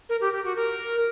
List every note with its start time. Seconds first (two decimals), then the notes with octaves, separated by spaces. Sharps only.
0.09 A#4
0.21 G4
0.33 G4
0.44 F#4
0.56 A#4